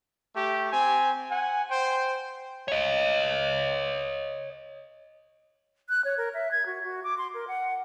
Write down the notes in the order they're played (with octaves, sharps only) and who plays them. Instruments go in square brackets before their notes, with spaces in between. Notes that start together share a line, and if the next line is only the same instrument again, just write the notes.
[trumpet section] A3 G4
C4 G#5
F#5 G#5
C5 G5
[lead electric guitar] C#5 D#5
[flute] F#6
C#5
A#4
E5
G#6
F#4
F#4
D6
C6
A#4
F#5